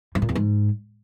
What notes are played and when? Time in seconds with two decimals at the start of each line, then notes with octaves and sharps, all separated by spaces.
0.15 G#2
0.22 A#2
0.29 E2
0.35 G#2